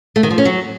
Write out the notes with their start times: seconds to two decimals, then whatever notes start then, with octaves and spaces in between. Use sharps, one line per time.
0.16 A3
0.23 D#3
0.31 F3
0.38 C#4
0.45 F#3